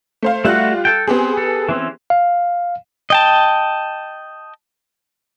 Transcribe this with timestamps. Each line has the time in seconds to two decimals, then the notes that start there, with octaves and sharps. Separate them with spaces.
0.22 A3 C5 F5
0.45 G3 A3 F4 F#4 F#6
0.85 A4 G5
1.07 B3 C4 G4 G#4
1.37 A4
1.69 E3 C4 C#4
2.10 F5
3.10 D#5 G5 A5